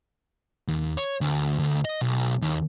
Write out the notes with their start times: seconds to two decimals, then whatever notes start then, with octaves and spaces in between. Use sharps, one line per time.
0.68 D#2
0.97 C#5
1.21 D2
1.60 D2
1.85 D#5
2.01 B1
2.42 D#2